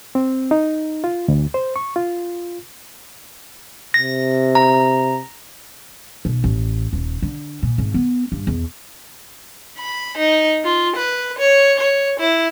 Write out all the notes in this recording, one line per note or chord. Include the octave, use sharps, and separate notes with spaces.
C4
D#4
F4
D2
C5
C#6
F4
C3 A#6
A#5
B1
A1
D#1
D3
A#2
G#1
B3
G2
E2
B5
D#4
F4
B4
C#5
C#5
E4